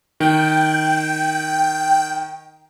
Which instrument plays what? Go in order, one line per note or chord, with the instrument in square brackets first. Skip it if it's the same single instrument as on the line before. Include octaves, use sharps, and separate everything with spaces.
[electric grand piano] D#3 [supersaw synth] G5